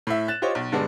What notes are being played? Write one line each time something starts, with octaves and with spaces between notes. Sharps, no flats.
A2 E5
F#6 A6 E7
F4 G4 C5 C#5 D#5
B1
G2 D3 G#3 B3 D4